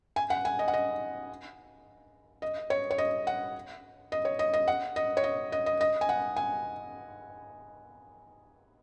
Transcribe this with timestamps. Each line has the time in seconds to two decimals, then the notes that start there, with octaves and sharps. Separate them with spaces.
0.16 G#5
0.30 F#5
0.45 G#5
0.59 D#5
0.68 F#5
0.74 D#5
2.42 D#5
2.70 C#5
2.91 C#5
2.98 D#5
3.27 F#5
4.12 D#5
4.25 C#5
4.39 D#5
4.54 D#5
4.68 F#5
4.96 D#5
5.17 C#5
5.24 D#5
5.52 D#5
5.66 D#5
5.81 D#5
6.01 G#5
6.09 F#5
6.36 G#5